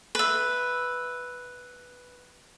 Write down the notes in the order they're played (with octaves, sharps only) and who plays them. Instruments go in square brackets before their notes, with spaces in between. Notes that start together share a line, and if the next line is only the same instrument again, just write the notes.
[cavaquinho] B4 E5